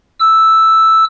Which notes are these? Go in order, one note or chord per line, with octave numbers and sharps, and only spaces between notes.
E6